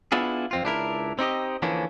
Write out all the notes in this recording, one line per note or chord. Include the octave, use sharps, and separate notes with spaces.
B3 D4 E4 F4 G#4
F2 C4 F4
C#2 D4 E4 A#4
C4 D#4 G4 D#5
D3 E3 F3 A#3 C#4 D4